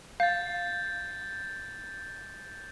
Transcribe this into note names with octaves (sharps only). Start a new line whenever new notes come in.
F5 G6 A6